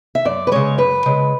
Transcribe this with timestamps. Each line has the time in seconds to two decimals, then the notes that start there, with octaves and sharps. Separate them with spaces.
0.15 E5
0.25 F#2 D5
0.47 B4
0.52 C#3 G#3 C#5
0.78 F#2 B4
1.06 C#3 G#3